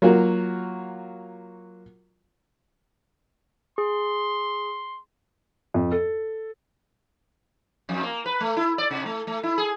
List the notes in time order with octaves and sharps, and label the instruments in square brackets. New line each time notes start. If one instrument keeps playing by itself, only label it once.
[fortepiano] F#3 A#3 F4 F#4
[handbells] G#4 [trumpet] C6
[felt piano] F2
A4
[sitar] F2
A#3
B4
A3
E4
D5
C3
A3
A3
E4
G#4